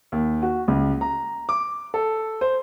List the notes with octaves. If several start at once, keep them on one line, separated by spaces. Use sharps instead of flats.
D#2
F#4
C#2
A#5
D6
A4
C5